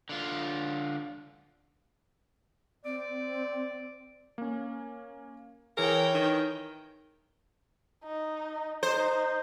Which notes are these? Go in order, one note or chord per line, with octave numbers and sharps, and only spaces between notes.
D3 F4
C4 D5
A#3 C#4
E3 G#4 A#4 C#5 G5
D#3
D#4
D#4 C5